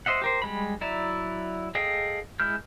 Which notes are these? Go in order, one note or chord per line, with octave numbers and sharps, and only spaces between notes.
C5 D#5 E5 F#5
G4 A#4 C5
G3 G#3 B5
F#3 E4 D5 E5 A#5
G#4 A4 D#5 F5 G5
G#3 E4 F6 G6